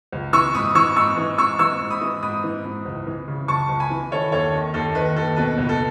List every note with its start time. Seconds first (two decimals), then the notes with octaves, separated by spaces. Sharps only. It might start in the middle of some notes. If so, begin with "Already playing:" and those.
0.12 C#2
0.33 E3 C#6 E6
0.55 G#2 B5 D#6
0.75 E3 C#6 E6
0.96 G#2 C#6 E6
1.17 E3
1.38 G#2 C#6 E6
1.59 E3 C#6 E6
1.80 G#2
1.90 B5 D#6
2.01 E3
2.23 G#2 B5 D#6
2.44 E3
2.64 G#2
2.85 C#2
3.07 E3
3.28 C#3
3.48 C#2 A5 C#6
3.69 C#2
3.80 G#5 B5
3.90 E3
4.11 D#3 A4 C#5
4.32 D#2 A4 C#5
4.53 D#3
4.74 D#2 A4
4.95 D#3 B4
5.16 D#2 A4
5.37 B2 B4
5.58 C#2
5.69 A4